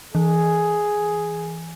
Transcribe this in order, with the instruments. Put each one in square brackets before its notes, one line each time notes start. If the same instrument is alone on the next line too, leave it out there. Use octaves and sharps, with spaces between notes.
[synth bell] E3 [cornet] G#4